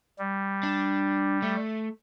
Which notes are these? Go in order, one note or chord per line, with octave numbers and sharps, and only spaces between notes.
G3
D4
A3